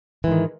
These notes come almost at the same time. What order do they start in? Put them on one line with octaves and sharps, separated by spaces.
E3 G#2 D#3